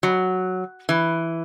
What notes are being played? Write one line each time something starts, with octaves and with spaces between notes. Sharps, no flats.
F#3
E3